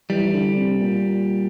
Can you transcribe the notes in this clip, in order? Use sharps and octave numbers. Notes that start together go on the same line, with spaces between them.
E3 G3
E3
D3
C3
A#2